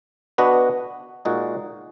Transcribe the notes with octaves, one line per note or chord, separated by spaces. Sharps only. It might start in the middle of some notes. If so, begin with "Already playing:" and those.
B3 D4 F#4 B4 D#5
A#2 G#3 D#4 F#4